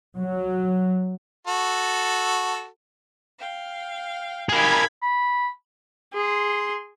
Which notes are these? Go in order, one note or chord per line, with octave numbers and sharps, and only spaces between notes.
F#3
F#4 A4
F5 G5
D#4 G4 G#4 A#4 F5 B5 G#6
B5
G#4 C6